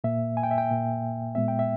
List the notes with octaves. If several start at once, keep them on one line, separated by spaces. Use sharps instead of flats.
A#2 A#3 E5
G#5
G5
E5
G5
A#2 A#3
A#2 G#3 B3 E5
G5
E5